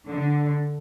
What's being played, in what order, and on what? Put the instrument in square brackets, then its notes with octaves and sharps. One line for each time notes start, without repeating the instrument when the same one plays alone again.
[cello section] D3